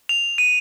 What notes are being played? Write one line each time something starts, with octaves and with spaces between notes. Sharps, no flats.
F7
D#7